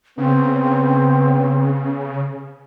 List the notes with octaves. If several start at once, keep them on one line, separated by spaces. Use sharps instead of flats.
C#3 B3 C4